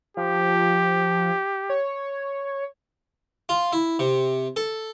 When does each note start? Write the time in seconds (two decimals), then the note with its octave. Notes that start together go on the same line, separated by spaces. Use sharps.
0.17 F3 G4
1.70 C#5
3.49 F4
3.72 E4
3.99 C3
4.56 A4